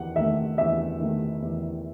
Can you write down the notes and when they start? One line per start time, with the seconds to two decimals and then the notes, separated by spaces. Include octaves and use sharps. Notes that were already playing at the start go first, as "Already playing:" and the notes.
Already playing: E2 D#3 F#5
0.16 D#3 A3 E5
0.58 E2 E5
1.00 D#3 A3
1.42 E2